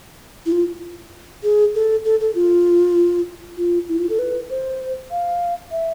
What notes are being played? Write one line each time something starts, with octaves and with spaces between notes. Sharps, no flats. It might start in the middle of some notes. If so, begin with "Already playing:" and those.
E4
F4
G#4
A4
A4
A4
F4
F4
E4
F4
A4
B4
C5
F5
E5